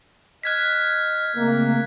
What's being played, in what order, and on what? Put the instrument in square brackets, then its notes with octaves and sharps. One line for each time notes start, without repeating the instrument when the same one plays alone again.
[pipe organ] D#5 F6 [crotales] F#6 G#6 B6
[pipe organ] C#3 A3 C4 [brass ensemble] A#3